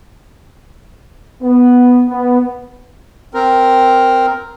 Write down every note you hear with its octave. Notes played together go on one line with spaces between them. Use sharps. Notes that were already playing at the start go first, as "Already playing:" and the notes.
B3
B3
C4 A#4